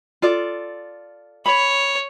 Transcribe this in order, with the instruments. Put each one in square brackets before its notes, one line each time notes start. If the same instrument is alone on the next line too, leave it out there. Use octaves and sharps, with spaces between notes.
[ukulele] F4 A4 D5
[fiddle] C#5 [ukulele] B5